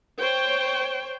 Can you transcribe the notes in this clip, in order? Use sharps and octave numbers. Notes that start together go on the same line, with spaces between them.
C5 C#5 G5